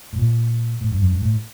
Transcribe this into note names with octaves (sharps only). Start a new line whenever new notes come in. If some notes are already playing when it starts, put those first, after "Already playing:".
A2
A#2
A2
G2
F#2
G2
A2